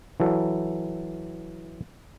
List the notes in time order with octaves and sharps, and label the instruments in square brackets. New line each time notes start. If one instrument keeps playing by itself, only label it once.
[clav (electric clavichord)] E3 F#3 A4